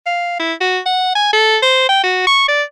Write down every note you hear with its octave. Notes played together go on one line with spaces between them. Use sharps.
F5
E4
F#4
F#5
G#5
A4
C5
G5
F#4
C#6
D5